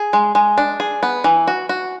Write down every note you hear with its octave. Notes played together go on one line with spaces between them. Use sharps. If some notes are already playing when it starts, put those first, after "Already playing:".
Already playing: G#4
G#3
G#3
D4
G#4
B3
E3
F#4
F#4